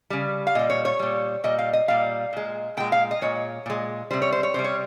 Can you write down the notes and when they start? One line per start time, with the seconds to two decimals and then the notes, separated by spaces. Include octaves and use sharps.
0.10 C#3 G3
0.47 F5
0.55 A#2 G3 D#5
0.70 C#5
0.85 C#5
0.99 A#2 G3
1.44 A#2 G3 D#5
1.59 F5
1.73 D#5
1.88 A#2 G3 F5
2.33 A#2 G#3
2.77 A#2 G#3 G5
2.92 F5
3.11 D#5
3.22 A#2 G#3 C#5
3.66 A#2 G#3
4.11 C3 G3 C5
4.22 C#5
4.32 C5
4.43 C#5
4.54 C3 G3 C5
4.64 C#5